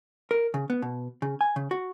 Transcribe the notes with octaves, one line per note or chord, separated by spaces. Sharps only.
A#4
C#3
B3
B2
C#3
G#5
C#3
F#4